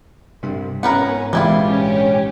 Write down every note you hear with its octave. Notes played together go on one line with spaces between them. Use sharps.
G2 C3 G3
G#2 B3 C#4 A#4 B4 F#5
A#1 G#2 C3 E3 G3 G#3 E4 F4
C#4 G4